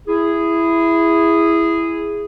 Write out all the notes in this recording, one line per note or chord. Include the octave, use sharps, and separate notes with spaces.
E4 G#4